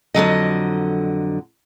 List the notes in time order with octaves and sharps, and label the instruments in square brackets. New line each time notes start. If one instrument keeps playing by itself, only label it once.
[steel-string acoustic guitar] F2 D3 F#3 D#5